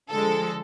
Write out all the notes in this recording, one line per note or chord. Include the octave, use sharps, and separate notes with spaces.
D3 F3 G#3 A4